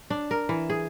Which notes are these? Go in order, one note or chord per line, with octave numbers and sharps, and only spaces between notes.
D4
A#4
E3
G#4